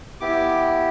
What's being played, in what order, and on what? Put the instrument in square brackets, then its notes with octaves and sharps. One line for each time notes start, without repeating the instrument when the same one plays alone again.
[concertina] B3 E4 G4 D6